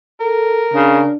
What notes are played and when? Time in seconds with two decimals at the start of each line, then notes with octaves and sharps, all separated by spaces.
0.20 A4 A#4
0.74 C#3 D4